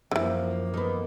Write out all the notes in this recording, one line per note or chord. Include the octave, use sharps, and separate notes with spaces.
F#2 D3 E3 F3 A#3
D#3 B3